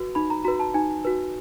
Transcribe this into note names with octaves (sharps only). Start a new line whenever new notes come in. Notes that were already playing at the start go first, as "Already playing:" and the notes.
Already playing: F#4 B4
D#4 B5
A#5
F#4 B4 A#5
A5
D#4 G#5
F#4 B4